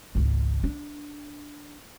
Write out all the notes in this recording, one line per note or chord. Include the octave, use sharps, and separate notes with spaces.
G#1 C#2
D4